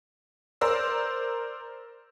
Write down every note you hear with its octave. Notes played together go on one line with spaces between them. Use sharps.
A#4 C5 D5 E6